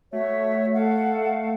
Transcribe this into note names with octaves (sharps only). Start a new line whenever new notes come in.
A3 F#4 C#5 E5
A4 F5 F#5